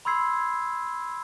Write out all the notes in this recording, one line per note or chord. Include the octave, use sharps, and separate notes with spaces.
B5 C6 E6 G#6 C7